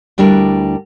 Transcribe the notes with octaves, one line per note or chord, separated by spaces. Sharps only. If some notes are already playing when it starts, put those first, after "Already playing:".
D2 G3 D4 E4 A#4